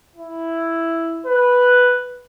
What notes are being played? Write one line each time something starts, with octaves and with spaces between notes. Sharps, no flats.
E4
B4